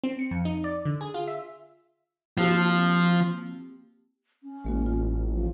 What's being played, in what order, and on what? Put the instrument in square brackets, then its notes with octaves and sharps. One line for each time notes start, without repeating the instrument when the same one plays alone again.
[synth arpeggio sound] C4
C#7
F2
D#4
D5
D3
G#4
F4
E5
[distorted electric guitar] F3 [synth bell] A#3 C4 G4
[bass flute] C#4
[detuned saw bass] A1 [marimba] G#3 A#3 F#4
[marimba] F4
[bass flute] F3